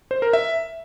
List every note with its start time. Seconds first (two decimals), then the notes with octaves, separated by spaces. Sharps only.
0.11 C5
0.22 A#4
0.33 E5